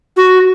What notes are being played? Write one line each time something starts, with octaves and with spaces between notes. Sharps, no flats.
F#4